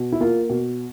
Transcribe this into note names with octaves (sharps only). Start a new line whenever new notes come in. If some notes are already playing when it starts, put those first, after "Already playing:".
Already playing: B2
E4
A#3 F4
B2